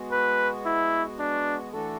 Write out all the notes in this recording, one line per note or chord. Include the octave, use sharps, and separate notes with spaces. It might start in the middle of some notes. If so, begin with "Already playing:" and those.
Already playing: G#3 B3 F#4
B4
E4
D4
E3 A3 D4 F#4 A4